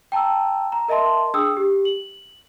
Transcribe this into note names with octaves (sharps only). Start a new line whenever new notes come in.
G5 A5 A#5 E6
A#5
A#4 D#5 E5 A5 C6
D4 G#4 G5 D#6 E6
G4
F#7